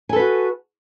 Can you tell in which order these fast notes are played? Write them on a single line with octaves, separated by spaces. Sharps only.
G#5 A4 B4 F#4